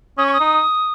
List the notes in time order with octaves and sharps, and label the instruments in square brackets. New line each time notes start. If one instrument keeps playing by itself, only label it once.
[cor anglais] C#4 [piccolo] D#6
[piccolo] C#6
D#6
[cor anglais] D#4